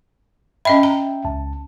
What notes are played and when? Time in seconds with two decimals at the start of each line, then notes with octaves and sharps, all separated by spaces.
0.65 C#4 D#5 E5 G5 B5
0.83 A#5
1.25 C#2 A5